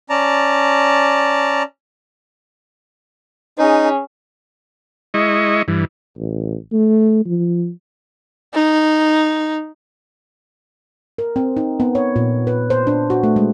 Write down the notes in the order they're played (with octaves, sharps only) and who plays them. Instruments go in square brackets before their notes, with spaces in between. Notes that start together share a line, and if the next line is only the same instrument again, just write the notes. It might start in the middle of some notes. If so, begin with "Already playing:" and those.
[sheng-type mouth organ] C#4 D5 A5 A#5
[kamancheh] C#4 G#4 [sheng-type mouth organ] D#4
[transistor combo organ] G#3 E4 D#5 C#6
G2 E3
[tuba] A1
A3
F3
[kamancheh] D#4
[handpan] A#4
C4
D#4
B3
C#5
A#2
B4
C5
D4
F#4
A3
G#3